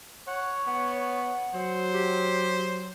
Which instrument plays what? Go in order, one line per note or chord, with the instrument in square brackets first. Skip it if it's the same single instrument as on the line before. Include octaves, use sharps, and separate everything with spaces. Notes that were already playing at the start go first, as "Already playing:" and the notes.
[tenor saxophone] C#5 [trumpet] F#5
[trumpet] B3 [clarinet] F#5
[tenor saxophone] F#3 [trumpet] C5
[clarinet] G4